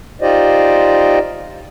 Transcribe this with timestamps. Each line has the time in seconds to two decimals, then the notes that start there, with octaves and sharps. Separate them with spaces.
0.22 D#4 F4 G4 C5 D5 D#5